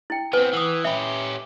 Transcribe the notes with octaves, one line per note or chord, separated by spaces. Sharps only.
E4 G5
B3 C4 B4 G#5
E3 F#5 D#6
C#4 G4 E5 B5